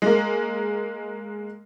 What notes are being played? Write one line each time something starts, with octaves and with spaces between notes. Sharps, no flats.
G#3 A#3